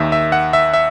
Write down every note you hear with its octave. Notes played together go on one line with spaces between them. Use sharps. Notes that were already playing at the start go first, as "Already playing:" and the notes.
Already playing: D#2 D#3 E5
E5
F#5
E5
E5